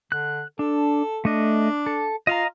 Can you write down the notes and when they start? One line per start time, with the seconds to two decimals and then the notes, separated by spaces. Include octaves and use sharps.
0.12 D3 F#6
0.59 D4 A4
1.25 A3 D4 D#5
1.86 A4
2.27 F4 D#5 F5 A#5